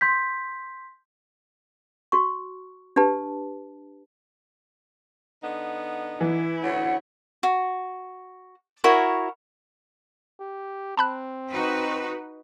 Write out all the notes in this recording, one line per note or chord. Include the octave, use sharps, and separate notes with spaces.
C6 G6 B6
F#4 C#6
D4 G4 B4 A5
D3 B3 D#4
E3 E4
D2 C#4 C#5 F#5
F#4
E4 F#4 A#4 C#5
G4
C4 A5 B5 F#6
D#4 F#4 B4